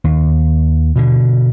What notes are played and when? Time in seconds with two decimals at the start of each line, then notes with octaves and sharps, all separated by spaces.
0.04 D#2
0.96 B2 D3